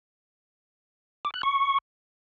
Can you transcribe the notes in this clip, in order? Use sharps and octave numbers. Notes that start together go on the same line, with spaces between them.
D6
F#6
C#6